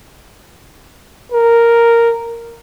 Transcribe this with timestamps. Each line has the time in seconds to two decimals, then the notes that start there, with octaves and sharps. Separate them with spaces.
1.32 A#4